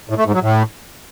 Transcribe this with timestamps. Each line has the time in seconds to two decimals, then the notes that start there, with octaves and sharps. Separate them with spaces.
0.09 A2
0.18 A3
0.26 G#2
0.34 F#3
0.42 A2